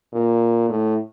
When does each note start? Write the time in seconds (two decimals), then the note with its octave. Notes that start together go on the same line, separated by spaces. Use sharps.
0.13 A#2
0.69 A2